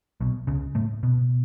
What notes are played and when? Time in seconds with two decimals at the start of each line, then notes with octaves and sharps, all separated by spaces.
0.21 B1 B2
0.47 C#2 C#3
0.75 A2 A3
1.03 B2 B3